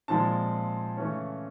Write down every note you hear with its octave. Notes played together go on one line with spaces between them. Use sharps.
A#2 F3 G#3 C4 A5
C#3 E3 A3 C#4